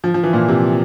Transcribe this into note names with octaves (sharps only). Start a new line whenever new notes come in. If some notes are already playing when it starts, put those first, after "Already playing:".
F3
F3
E3
A#2
C3